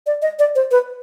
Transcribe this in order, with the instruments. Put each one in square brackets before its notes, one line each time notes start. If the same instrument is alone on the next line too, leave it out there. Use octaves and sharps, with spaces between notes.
[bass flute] D5
D#5
D5
C5
B4